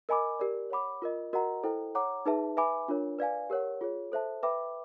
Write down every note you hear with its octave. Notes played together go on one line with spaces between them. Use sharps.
A#4 D#5 G#5 B5 D6
G4 A#4 D5
C#5 F#5 B5 D6
F4 A#4 D#5
F#4 A#4 D#5 F#5 A#5
E4 A4 C5 D#5 G5
C#5 F#5 A#5 D6
D#4 G#4 B4 E5 A5
B4 E5 G#5 B5 D6
D4 F4 A#4 C#5
B4 D5 F5 G#5
G4 A#4 C#5 F#5
F4 G#4 C#5
A4 C5 E5 A5
B4 E5 G5 B5 D6